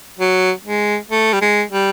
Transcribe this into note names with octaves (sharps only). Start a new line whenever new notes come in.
F#3
G#3
A3
G3
G#3
G3